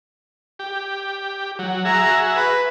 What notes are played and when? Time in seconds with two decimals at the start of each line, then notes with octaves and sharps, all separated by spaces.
0.59 G4
1.59 F#3
1.85 F#4 G#4 E5 A#5
2.37 B4